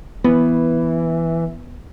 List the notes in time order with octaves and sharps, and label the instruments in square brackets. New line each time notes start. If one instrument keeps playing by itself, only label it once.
[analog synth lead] E3 [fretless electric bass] B3